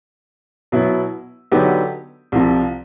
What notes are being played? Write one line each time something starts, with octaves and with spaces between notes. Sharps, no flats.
B2 F#3 B3 E4
D3 F#3 B3 D#4 G4
C2 C3 F3